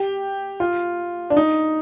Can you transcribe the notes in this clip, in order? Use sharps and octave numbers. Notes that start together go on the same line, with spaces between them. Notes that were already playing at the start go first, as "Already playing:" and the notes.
Already playing: G4
F4
D4
D#4